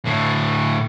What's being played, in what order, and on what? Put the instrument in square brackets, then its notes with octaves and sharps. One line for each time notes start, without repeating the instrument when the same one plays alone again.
[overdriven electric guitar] A2 D3